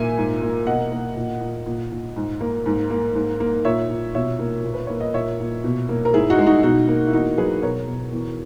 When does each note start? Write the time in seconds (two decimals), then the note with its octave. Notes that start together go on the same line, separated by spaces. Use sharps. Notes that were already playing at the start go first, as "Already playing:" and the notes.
Already playing: A#2 A#3 E5 G#5
0.17 G#2
0.42 A#3
0.66 B2 D#5 F#5
0.92 A#3
1.16 A#2
1.41 A#2
1.66 A#2
1.91 A#2
2.16 G#2
2.41 A#3
2.66 G#2
2.90 A#3
3.15 G#2
3.40 A#3
3.65 A#2 C#5 E5
3.90 A#2
4.15 B2 C#5 E5
4.39 A#3
4.64 A#2
4.74 B4
4.87 A#3 C#5
5.00 D#5
5.14 A#2 C#5 E5
5.40 A#2
5.64 B2
5.89 A#3
6.05 A#4
6.14 G#2 E4 G#4
6.30 D#4 F#4
6.39 G#3
6.46 D#4 F#4
6.63 B2 D#4 F#4
6.88 A#3
7.07 E4
7.13 E2 D#4 F#4
7.38 F#3 G#4 B4
7.63 B2 A#4 C#5
7.88 B2
8.12 E2